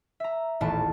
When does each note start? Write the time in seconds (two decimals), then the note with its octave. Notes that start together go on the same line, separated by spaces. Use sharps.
0.20 E5 A#5
0.60 D#1 A1 B3 A5